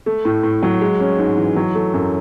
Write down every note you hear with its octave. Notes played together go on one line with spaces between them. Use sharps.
A3
A2
A2
F#3
G#3
C#4
G#2
E3
F#3
A3
F#2